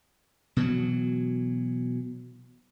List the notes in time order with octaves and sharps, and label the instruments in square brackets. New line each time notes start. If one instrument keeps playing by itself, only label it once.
[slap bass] B2 E3 F#3